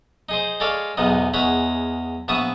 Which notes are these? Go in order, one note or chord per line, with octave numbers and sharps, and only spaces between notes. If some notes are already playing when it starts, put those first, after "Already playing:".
D#4 G#4 C5
G#3 A4 C#5 D5 F5
B1 E2 G#2 B3 D#4
E2 G#3 C#5 F#5 B5
A#1 B3 E5 A5 C#6 D#6